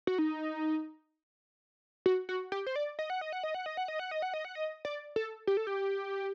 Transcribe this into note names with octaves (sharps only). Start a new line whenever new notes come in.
F#4
D#4
F#4
F#4
G4
C5
D5
D#5
F#5
D#5
F#5
D#5
F#5
D#5
F#5
D#5
F#5
D#5
F#5
D#5
F#5
D#5
D5
A4
G4
A4
G4